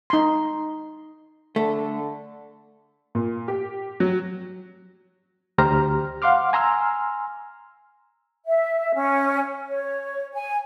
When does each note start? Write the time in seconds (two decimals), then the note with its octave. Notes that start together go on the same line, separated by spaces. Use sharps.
0.10 D#4 C6
1.56 D3 A3
3.15 A#2
3.48 G4
4.00 F#3
5.58 D2 G4 C5 A#5 F6
6.22 F5 F#5 C6 D6 F6
6.53 G#5 A#5 C6 E6 F6
8.46 E5
8.94 C#4
9.68 C#5
10.33 G#5